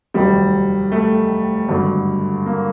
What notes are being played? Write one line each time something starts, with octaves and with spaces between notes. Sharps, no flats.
F1 D#2 D#3 F#3 G3
A3
G#1 G2 D3 F#3
A#3